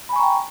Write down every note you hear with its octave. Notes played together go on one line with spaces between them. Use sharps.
G5 G#5 A#5 B5 C#6